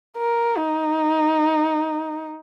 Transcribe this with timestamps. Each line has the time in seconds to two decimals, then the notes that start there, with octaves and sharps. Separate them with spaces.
0.18 A#4
0.57 D#4